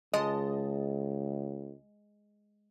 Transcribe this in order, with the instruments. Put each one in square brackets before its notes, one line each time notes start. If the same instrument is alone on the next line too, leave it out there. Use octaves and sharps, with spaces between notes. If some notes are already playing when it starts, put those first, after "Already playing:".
[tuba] C#2 [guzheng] G#3 [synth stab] D#5 A5